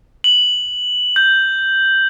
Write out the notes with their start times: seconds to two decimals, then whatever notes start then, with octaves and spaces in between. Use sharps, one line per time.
0.24 F#7
1.16 G6